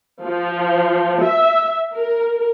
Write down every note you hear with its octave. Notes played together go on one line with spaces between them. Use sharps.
F3
E5
A#4